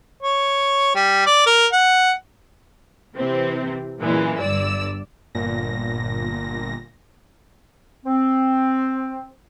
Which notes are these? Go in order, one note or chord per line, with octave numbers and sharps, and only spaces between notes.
C#5
G3
D5
A#4
F#5
C3 E3 C4
F#2 A#2 E3 G#3
G1 G2 D5 E6
G1 A#2 A#6
C4